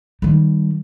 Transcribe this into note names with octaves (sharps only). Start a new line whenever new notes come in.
D#3 G3